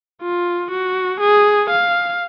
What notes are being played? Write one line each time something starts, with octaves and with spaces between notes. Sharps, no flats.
F4
F#4
G#4
F5